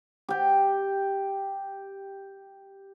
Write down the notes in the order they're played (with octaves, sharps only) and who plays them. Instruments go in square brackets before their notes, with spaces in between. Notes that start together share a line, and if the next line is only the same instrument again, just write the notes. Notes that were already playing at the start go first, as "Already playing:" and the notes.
[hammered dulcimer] G4 G5